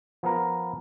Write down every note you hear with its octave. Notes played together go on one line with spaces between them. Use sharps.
F3 B3 A#4